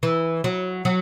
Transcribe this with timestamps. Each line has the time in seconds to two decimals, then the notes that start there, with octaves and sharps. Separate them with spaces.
0.03 E3
0.44 F#3
0.85 F#3